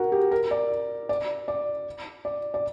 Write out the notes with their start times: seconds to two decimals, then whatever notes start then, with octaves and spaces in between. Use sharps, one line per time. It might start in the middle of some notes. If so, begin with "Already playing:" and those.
Already playing: F#4 A#4
0.12 G4
0.31 A#4
0.51 D5
1.09 D5
1.48 D5
2.25 D5
2.54 D5